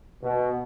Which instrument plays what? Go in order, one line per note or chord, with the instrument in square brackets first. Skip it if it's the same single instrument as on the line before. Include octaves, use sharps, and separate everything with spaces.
[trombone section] B2